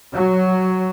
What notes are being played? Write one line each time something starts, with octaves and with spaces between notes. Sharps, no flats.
F#3